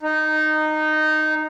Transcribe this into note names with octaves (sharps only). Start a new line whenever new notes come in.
D#4